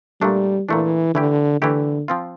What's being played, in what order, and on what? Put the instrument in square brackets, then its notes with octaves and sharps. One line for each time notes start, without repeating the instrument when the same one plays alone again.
[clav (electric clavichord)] A#2 A3 D4 [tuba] G3
[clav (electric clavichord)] A#2 A3 D4 [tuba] E3
[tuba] D3 [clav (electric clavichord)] E3 A3 E4 G4
[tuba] D3 [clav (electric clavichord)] E3 A3 E4 G4
[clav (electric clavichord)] F3 C4 F4